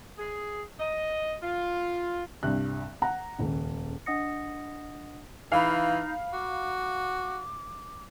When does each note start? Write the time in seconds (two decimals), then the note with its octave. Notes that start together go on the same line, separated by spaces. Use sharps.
0.18 G#4
0.80 D#5
1.43 F4
2.43 C2 G2 F#6
3.02 F#5 A#5
3.38 D#1 C#2
4.06 D4 D#5 F#5 D#6 A#6 C#7
5.52 E3 D#4 F5 B5
6.33 F#4 D6